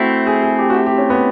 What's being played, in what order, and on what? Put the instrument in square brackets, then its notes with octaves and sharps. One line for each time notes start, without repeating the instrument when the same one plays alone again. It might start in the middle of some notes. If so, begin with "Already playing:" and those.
Already playing: [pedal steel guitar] A3 C4 E4 [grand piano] F#4
[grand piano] G#4
G#4
G4
F#4
G4
G4
C#4
B3